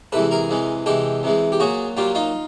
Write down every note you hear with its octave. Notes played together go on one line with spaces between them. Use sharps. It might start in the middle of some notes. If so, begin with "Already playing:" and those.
C3 E3 G#3 A4 B4
G#4 A#4
C3 E3 G#3
C3 E3 G#3 G4 A4
C3 E3 G#3
G4
A#2 F#3 F#4 G#4
A#2 F#3 F4 G4
D#4 F4